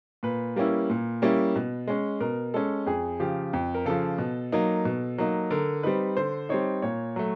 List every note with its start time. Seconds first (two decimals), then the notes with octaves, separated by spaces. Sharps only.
0.23 A#2 B4
0.56 G3 A#3 C#4 E4
0.90 A#2
1.22 G3 A#3 C#4 E4
1.55 B2
1.87 G#3 C#4
2.20 B2 A#4
2.54 G#3 C#4 A4
2.86 F2 G#4
3.20 C#3 F3 G4
3.53 F2
3.75 A#4
3.86 C#3 F3 A4
4.18 B2
4.52 F#3 A#3 D#4
4.85 B2
5.18 F#3 A#3 D#4
5.50 D3 A#4
5.83 G3 C4 D#4 B4
6.17 D3 C5
6.49 G3 C4 D#4 C#5
6.82 A#2 C#5
7.16 F#3 A3